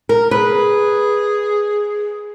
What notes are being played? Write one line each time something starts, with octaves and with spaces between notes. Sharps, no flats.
A#4
G#4 B4